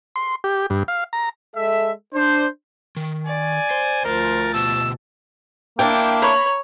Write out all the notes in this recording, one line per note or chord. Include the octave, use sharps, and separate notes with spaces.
C6
G4
G2
F5
A#5
G#3 A4 E5
D4 C5
D#3
D5 G#5
C5
D2 F3 A#4 A6
B2 G4 A5 E6
A#3 D4 E4 G5
C#5 A#5 B5